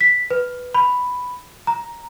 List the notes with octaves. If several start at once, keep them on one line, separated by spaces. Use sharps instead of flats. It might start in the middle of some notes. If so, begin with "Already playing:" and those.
B6
B4
B5
A#5